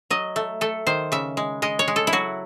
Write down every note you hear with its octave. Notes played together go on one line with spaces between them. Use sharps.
F#3 D#5
A3
A3 A4
D#3 C5
C#3 E5
G#3
G#3 D#5
C#5
G#3
A4
E4
F#3 F#4